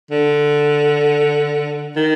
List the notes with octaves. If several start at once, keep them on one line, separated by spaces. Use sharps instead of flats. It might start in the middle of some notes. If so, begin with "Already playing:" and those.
D3
D#3